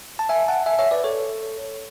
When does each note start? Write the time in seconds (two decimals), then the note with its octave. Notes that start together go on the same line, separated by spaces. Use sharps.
0.19 A5
0.29 E5 G#5
0.48 F#5 A5
0.66 E5 G#5
0.79 C#5 E5
0.91 B4 D5
1.04 A4 C#5